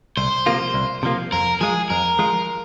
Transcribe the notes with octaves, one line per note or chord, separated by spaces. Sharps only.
C2 C5
C3 F3 A#3 F4
C2
C3 F3 A#3 F4
F2 A#4
F3 G#3 F4 G#4
F2 A#4
F3 G#3 F4